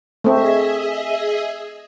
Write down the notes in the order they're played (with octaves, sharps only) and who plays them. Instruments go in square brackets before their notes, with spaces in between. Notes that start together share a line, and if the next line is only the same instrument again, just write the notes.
[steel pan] A3 C4 [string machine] G#4 D#5 E5